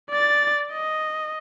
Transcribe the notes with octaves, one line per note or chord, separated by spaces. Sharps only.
D5 A6
D#5